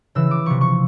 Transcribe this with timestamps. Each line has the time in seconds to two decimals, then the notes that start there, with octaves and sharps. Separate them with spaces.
0.15 C#3 E3 E6
0.31 D6
0.46 C3 F3 C#6
0.61 C#6